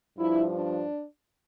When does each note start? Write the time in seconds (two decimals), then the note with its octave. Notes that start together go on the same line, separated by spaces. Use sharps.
0.17 G2 F3 E4
0.53 D4